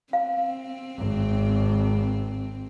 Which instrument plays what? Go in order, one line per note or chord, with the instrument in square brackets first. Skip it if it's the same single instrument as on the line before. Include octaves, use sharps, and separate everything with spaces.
[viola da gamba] C4 [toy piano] F5
[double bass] G#1